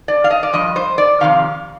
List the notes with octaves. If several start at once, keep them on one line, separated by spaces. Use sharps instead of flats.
D5
F5
D#5
D5
G2 F3 D#5
C5
D5
F2 C3 D#3 F5